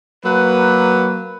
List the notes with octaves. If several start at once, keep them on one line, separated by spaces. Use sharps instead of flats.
F#3 A#3 B4